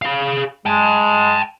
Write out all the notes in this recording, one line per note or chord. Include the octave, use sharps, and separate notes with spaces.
G#4 F5
G#3 G5 A5